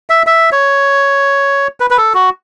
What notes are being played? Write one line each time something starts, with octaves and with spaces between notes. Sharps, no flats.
E5
E5
C#5
B4
B4
A4
F#4